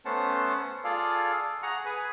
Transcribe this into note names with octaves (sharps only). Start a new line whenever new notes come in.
A3 B3 C#4 C5 F#5 A5
F4 G#4 A4 D5 F5
G#4 F#5 A#5 C#6
G#4 B4 G#5